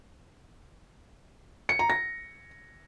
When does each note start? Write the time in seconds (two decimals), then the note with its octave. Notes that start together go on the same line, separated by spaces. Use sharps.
1.69 C#7
1.79 A#5
1.90 A#6